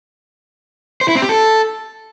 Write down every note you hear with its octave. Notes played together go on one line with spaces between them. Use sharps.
C5
E4
C4
G4
A4